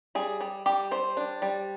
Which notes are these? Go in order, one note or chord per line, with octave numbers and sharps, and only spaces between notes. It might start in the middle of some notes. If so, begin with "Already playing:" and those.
G3 G#4
G3
G3 G4
G3 C5
D4
G3